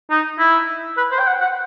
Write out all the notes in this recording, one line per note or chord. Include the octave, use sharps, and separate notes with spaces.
D#4
E4
B4
C5
G5
F#5
F#5